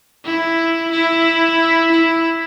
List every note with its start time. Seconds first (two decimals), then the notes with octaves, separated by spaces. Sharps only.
0.25 E4
0.91 E4
1.91 E4